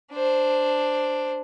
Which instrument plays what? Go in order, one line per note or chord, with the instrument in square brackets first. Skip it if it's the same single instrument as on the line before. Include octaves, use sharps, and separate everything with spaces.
[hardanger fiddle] D4 C5